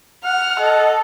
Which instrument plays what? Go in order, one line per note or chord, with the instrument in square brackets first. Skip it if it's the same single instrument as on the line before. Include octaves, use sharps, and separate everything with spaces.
[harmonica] F#5 [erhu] F6
[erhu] A4 [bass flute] D#5